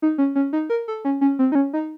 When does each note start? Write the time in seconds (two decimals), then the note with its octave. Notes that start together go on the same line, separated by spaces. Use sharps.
0.02 D#4
0.18 C#4
0.35 C#4
0.53 D#4
0.70 A#4
0.88 A4
1.05 C#4
1.21 C#4
1.39 C4
1.52 D#4
1.55 C#4
1.73 D#4